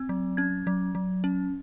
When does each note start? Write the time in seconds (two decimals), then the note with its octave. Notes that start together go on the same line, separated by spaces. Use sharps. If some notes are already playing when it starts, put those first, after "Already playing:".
Already playing: C4
0.09 F#3
0.37 C#4 G#6
0.67 F#3
0.95 F#3
1.24 C#4